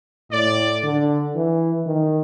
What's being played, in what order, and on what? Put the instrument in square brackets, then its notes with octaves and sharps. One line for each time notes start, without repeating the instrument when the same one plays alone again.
[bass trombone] A2 [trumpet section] D5
[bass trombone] D3
E3
D#3